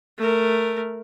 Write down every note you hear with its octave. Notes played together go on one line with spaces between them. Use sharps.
A3 A#4